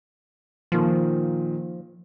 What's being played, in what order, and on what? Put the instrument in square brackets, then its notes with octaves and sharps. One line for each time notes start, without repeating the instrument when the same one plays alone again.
[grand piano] A#2 D#3 [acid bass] F3